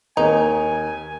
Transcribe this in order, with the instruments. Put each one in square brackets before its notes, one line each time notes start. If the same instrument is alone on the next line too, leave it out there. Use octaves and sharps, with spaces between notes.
[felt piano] D#2 A#3 [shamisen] D#4 [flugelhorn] G#5